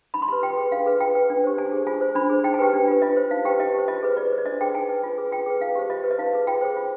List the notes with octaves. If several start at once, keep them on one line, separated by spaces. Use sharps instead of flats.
D#4 B5
C6
G4 B4 B5
F4 G5
G#4 B4
D4 F5
G#4 B4
F4 G5
B4
D4
G4 C5
D4 G#5
G#4 C5
F4 G#5
C5
D4 B5
G#4 C5
D#4 G5
G#5
G4 B4 G5
D4
F4 B4
F4 D#5
C5
D#4 F5
G4 B4 G5
D#4 D#5
G4 C5
F4 D#5
G#4 B4
F4 D5
C5
D5
D4 D#5
G#4 B4 G5
D#4 G#5
B4
F4
G#4 B4
F4 G5
G#4 B4
D#4 F5
G4 C5
F4 D#5
B4
D#5
D#4 F5
G#4 B4
F4 G5
G#4 C5
F4